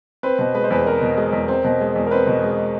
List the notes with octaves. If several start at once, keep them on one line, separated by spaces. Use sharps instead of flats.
C4 B4
B2
G#3 B4
C5
E2 B4
C4 A#4
B2
G#3
E2
C4
B2
G#3
E2
A#4
C4 B4
B2
G#3